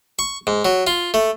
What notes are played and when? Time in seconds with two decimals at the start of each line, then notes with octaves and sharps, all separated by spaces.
0.19 C#6
0.47 G#2
0.65 F#3
0.87 F4
1.14 A3